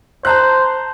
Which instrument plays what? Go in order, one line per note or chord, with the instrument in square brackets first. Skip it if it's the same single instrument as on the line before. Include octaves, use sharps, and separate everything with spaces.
[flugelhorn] C5 [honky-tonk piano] A5 A#5 F#6